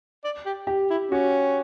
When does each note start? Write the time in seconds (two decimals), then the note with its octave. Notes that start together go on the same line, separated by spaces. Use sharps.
0.24 D5
0.45 G4
0.67 G4
0.90 E4
1.11 C#4 F#4